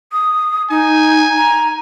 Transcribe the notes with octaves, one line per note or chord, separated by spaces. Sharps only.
D#6
D#4 G#5
A#5